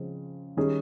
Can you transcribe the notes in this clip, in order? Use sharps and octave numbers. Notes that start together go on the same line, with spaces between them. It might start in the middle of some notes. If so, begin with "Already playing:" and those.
Already playing: C#3 F3 G#3 C4
D#3 G3 C#4 G#4